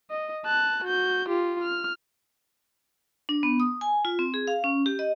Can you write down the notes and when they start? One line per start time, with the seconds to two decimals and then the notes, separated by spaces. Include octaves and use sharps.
0.10 D#5
0.45 A5 F#6
0.84 F#4 G6
1.29 F4 G4
1.62 F6
3.29 D4
3.43 B3
3.60 D#6
3.81 G#5
4.05 F4
4.19 C4
4.34 G#4
4.47 F5
4.64 C#4
4.86 G4
4.99 D#5